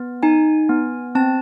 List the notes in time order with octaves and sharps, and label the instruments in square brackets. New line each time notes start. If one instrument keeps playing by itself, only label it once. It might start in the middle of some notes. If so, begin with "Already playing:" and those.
Already playing: [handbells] B3
D#4 G#5
B3
C4 A5